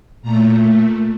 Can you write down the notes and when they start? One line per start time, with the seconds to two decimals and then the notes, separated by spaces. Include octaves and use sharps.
0.22 A#2 A3 A#5